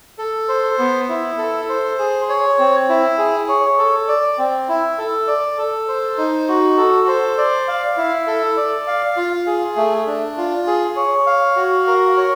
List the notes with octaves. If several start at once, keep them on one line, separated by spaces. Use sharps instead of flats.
A4
C5
B3
E4
A4
C5
G#4
C#5
C4
E4
G#4
C#5
A4
D5
C4
E4
A4
D5
A4
C5
D#4
F#4
A4
C5
D5
F5
E4
A4
D5
F5
F4
G#4
A3
D4
F4
G#4
C#5
F5
F#4
A#4
C#5